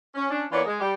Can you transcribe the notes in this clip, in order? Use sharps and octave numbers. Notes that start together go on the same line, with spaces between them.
C#4
C#4 D4
E3 A#3 B3 F4 C#5 D5
G#3
G3 G4